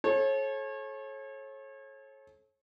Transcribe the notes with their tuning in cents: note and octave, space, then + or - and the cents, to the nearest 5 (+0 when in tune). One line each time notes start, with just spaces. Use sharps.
A4 -40 C#5 -35